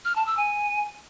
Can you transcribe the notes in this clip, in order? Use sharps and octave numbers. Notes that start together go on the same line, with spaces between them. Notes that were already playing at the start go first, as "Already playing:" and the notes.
F6
A5
E6
G#5